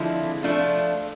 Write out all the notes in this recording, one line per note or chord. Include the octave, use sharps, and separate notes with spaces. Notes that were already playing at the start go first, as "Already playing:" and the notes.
Already playing: D3 F3 G#3 C4 E4
F3 A3 D4 F4